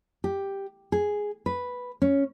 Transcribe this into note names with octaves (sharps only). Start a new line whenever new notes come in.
G4
G#4
B4
C#4